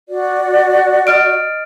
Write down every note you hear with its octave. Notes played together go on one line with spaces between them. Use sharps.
F#4 D5
D#5 F6 D7